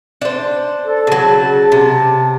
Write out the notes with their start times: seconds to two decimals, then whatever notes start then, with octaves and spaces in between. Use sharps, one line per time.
0.22 D4 C5
0.85 A4
1.07 C#3 F#3 A5
1.72 C3